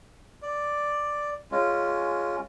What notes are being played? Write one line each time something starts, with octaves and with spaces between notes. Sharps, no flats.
D5
G#3 C#4 F4